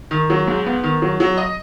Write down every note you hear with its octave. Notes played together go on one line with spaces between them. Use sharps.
D#3
F#3
G#2
B3
D#3
F#3
F#3
D#5